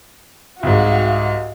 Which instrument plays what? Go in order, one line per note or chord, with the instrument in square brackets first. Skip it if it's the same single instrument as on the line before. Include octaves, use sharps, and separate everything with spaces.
[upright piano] C2 G#2 [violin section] F#4 F5